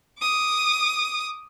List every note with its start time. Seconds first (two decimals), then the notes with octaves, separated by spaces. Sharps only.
0.19 D6 D#6